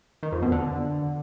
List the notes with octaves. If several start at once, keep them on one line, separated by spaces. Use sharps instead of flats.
D#3
F2
B2
D3